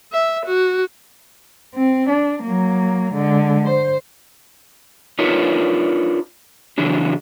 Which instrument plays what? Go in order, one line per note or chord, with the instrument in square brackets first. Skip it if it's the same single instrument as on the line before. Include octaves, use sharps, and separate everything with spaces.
[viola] E5
F#4
[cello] C4
D4
F#3 A#3
D3 G#3
C5
[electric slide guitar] D4 D#4 F4 A#4 B4 C#5
C#3 E3 F#3 D4